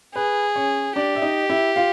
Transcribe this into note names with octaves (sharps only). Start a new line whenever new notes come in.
G#4 B4
C#4 C#5
D4 G4 D5
E5
D#4 D#5
E4 E5
F4 F5